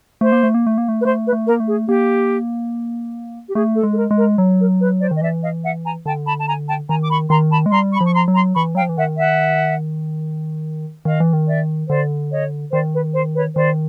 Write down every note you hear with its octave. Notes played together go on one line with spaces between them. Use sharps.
A3 C5
A#3
A3
A#3
A3
A#3
A3
B4
A3 C5
B4
A3
A#4
A#3
A3
G#4
A#3 G4
G4
A3 G#4
A4
G#3
A4
A#4
G#3
A#4
F#3
A#4
B4
C5 D5
D#3 D#5
E3 D5 E5
D#5 F5
E5 F#5
G#5 A#5
D3 G5 A5
A5 B5
A5
G#5 A#5
G5 A5
D#3 G#5 A#5
D6
B5 C#6
D#3 A#5 C6
A5 B5
G#3
G3 A#5 C6
B5 C#6
F3
C#6
A#5 C6
F#3
A#5 C6
E3 B5 C#6
F#3 F5 G5
F3
E3
D#3 E5 F#5
E5 F#5
D#3 D#5 F5
E3
D#3
D5 E5
D3 C5 D5
C#5 D#5
D#3 C5 D5
B4
C5
B4 C#5
D#3 C5 D5